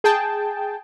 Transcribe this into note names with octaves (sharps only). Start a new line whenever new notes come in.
G#4 G5 A5